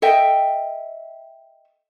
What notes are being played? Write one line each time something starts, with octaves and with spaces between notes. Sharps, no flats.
A4 D#5 E5 G5